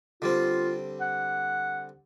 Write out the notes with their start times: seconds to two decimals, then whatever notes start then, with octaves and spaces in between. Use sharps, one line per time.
0.22 D3 G3 C4 F4
1.00 F#5